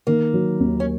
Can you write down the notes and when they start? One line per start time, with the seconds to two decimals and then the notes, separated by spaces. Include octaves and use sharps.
0.07 D#3 A#3
0.33 F#3
0.60 D#2
0.80 C#4